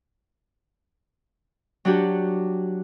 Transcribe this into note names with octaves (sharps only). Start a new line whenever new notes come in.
F#3 D4 F#4 G4